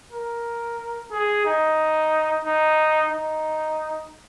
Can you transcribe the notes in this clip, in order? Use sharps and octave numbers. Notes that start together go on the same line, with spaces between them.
A#4
G#4
D#4
D#4
D#4